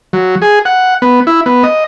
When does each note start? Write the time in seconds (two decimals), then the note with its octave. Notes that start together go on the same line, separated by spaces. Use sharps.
0.13 F#3
0.42 G#4
0.65 F#5
1.02 B3
1.27 E4
1.46 B3
1.63 D#5